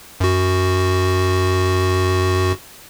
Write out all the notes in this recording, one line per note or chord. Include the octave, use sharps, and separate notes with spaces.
F#2 F#4